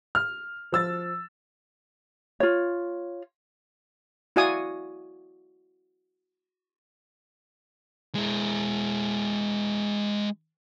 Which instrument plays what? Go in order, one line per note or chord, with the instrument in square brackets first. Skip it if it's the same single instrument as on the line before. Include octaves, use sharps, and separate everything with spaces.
[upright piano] F6
F3 E6 A6
[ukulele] F4 C#5
[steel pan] E4 F#4 D5 F5 G#5 D#6
[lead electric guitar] G#3 E4